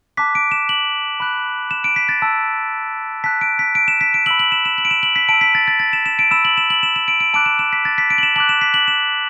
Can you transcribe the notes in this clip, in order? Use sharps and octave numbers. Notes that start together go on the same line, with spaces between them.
A5 D6 F#6 B6
D7
E7
F#7
B5 F#6
E7
D7
B6
A6
A5 E6
A5 F#6 B6
D7
B6
D7
E7
B6
D7
B5 E6 F#7
F#7
E7
E7
F#7
D7
E7
F#7
B6
A5 E6 D7
B6
A6
A6
A6
E7
E7
D7
B5 E6 E7
F#7
E7
F#7
E7
E7
D7
D7
A5 D6 F#6 D7
E7
E7
B6
A6
B6
D7
F#7
E7
A5 D6 F#6 F#7
E7
B6
F#7
E7